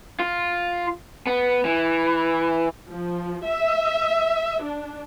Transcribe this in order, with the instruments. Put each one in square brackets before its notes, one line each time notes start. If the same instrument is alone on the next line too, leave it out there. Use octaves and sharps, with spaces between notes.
[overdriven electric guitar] F4
B3
E3
[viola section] F3
E5
D4